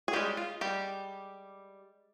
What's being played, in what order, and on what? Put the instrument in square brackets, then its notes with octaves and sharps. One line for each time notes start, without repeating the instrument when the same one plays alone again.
[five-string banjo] G#4
G3 G#3 C#4 G4
F4
G3 G4